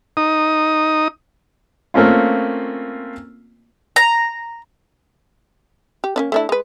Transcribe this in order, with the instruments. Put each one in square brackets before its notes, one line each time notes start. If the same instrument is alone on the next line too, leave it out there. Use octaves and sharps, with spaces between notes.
[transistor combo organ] D#4 D#6
[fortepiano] A3 A#3 C4 C#4 F4
[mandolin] A#5
[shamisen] G4
A#3 C#4 D4
A3 D4 E4
G#3 B4